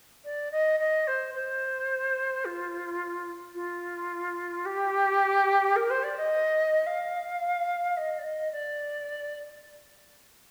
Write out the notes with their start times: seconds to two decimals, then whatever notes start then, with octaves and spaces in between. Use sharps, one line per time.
0.24 D5
0.51 D#5
0.79 D#5
1.07 C5
1.34 C5
2.45 F4
3.54 F4
4.65 G4
5.76 A#4
5.90 C5
6.03 D5
6.17 D#5
6.86 F5
7.97 D#5
8.18 D5
8.23 D#5
8.51 D5